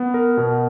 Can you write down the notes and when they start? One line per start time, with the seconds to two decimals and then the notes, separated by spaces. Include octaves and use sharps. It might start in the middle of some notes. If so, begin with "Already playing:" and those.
Already playing: B3
0.14 A#4
0.37 B2